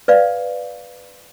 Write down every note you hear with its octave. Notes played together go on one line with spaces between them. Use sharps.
B4 D5 F5